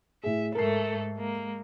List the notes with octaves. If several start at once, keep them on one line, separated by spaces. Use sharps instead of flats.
A2 G#4 E5
G#2 A3 A4 A#4 C7
G#3 A#3